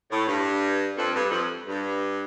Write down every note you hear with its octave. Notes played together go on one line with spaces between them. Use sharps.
A2
G2
F2
G2
F2
G2